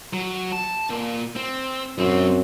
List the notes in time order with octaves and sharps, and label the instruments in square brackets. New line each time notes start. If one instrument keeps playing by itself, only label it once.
[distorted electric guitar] F#3
A5
A#2
C4
[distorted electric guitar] B1 C4 [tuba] F#2